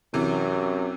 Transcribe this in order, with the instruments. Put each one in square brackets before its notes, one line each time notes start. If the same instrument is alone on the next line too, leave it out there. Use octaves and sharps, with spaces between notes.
[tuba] F#2 [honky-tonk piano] C3 E3